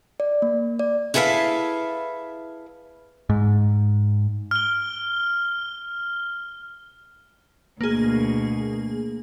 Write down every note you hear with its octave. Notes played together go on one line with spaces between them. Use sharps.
D5
A#3
D5
E4 G#4 A4 B4 E5 F5
G#2
F6 G7
D2 B2 A#3 G#4